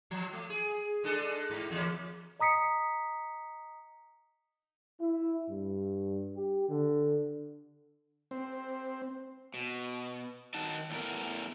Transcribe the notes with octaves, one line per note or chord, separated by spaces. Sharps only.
F3
A3
G#4
G#3 D4 A4
G#2
E2 C#3 A#3
D#5 A#5 D#6 B6 C#7
E4
G2
G4
D3
C4
B2
D#3 D#4 F#4 A5
E2 A2 E3 A#4